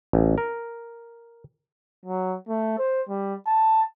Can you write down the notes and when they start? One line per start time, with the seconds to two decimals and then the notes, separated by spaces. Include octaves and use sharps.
0.13 A1
0.38 A#4
2.06 F#3
2.49 A3
2.79 C5
3.09 G3
3.47 A5